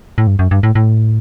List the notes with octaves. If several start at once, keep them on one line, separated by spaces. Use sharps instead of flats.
A2
G2
F#2
G2
A2
A2